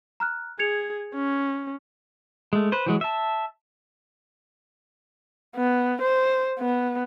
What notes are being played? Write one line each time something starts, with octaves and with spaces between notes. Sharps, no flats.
A#5 F6 F#6
G#4 G#6 C#7 F7
C#4
G#3 A3
B4 C5
E3 F#3 G#3
E5 A5
B3
C5
B3